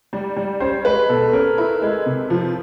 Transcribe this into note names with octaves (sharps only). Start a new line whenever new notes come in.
G3
G3
C#4 C5
G#3 B4
B2 A4
C#4 A#4
E4
G#3
C3
F3